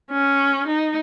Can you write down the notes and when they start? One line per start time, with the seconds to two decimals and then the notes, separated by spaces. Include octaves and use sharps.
0.11 C#4
0.67 D#4